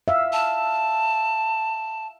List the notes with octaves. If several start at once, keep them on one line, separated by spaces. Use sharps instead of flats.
E5 F5
A5